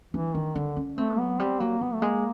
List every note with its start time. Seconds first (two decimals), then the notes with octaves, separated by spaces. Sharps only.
0.14 E3 D4
0.35 D#3 D4
0.55 D3 D4
0.76 C#4
0.98 A3 C4
1.18 F#3 B3
1.39 G3 C4
1.60 F#3 A#3
1.81 F#3 B3
1.93 A3
2.02 G#3 A#3